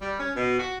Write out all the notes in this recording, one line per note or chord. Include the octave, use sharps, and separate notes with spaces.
G3
C#4
B2
F#4